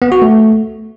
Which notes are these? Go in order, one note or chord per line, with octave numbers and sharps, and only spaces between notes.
B3
F#4
A3